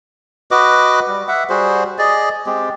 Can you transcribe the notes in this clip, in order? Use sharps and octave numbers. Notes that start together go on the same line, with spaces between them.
F#4 B4 D#5 D6
G3
E5 F#5
G3 F#4 G#4 C5
G#4 D5 D#5
G#3 C4 G4